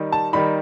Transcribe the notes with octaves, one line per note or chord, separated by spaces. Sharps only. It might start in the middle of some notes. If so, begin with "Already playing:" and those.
Already playing: D#3 G3 D#4
A5
D#3 G3 D#4 B5